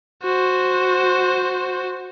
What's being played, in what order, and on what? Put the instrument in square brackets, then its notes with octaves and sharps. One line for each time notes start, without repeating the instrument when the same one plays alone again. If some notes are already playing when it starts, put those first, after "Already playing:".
[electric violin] F#4 C5